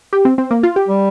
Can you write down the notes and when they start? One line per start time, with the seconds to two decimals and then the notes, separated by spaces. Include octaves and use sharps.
0.13 G4
0.25 C4
0.38 C4
0.51 A#3
0.63 F4
0.76 G4
0.88 G3